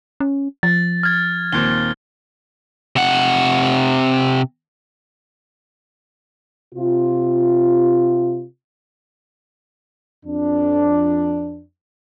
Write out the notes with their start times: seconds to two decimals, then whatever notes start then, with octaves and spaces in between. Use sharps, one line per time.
0.20 C#4
0.63 F3 A6
1.03 F6 G#6
1.53 D#2 A#2 C4 G7
2.96 C3 F#5
6.75 C3 F4
10.25 F2 D4